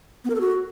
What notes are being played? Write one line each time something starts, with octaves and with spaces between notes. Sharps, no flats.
B3
A#4
A4
F#4